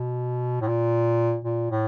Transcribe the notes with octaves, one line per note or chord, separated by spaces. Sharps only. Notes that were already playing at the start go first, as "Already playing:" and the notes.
Already playing: B2
A2
A#2
A#2
A2